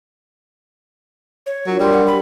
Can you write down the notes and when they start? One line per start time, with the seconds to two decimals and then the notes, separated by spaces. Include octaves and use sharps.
1.46 C#5
1.66 F#3 D4 F4 A#4
1.80 G3 D4 G4 A#4 C6
1.93 F#5
2.06 B5